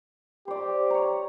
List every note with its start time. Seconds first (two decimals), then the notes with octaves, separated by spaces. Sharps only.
0.48 G4 C5 D5
0.90 C#5 A#5